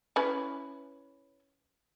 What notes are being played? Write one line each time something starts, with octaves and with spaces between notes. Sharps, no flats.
C#4 E4 B4